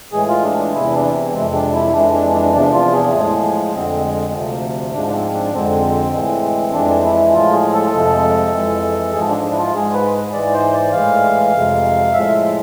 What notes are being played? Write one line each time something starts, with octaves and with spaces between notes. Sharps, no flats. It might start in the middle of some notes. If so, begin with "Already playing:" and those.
A2 E3 G#3 G#4
F4
D4
D4
E2 C3 E3 E4
D4
C4
F2 C3 G#3 C4
D4
E4
F2 E3 G#3 D4
D4
D4
E2 C3 F3 D4
F4
G#4
A2 F3 G#3
F2 D3 G#3 C4
D2 C3 F3
G#2 F3 G#3 D4
D4
C4
D4
F2 D3 G#3 C4
A2 E3 G#3
F2 E3 G#3 D4
E4
A2 F3 G#3 F4
G#4
A4
F2 C3 F3 G#3
F2 E3 G#3
G#2 F3 G#3 G#4
D4
D4
E4
F4
G#2 G#3 G#4
B4
G#2 E3 G#3 D5
C5
D5
A2 E3 G#3 F5
F2 C3 G#3
A2 F3 G#3 E5